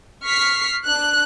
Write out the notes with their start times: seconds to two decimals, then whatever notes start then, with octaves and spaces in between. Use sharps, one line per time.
0.24 C#6 F6 B6 C7
0.86 D4 F#6